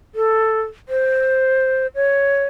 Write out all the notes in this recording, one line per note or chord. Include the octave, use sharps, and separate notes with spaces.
A4
C5
C#5